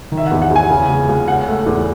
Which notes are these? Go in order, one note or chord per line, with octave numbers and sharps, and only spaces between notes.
D#3
E5
E2 F#5
F#5
E2 G#5
C#3
C#2
C#2
C#3 F#5
A3
E2